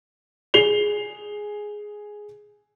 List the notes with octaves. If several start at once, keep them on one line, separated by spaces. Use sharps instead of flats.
G#4 C7 F7 G7